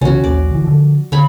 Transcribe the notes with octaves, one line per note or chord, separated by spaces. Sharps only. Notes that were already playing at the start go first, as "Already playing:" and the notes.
C2 C#3 E3 C#4 F#4
D#1 A#1 D5
G1 E3
D3 F3
D3 C#5 B5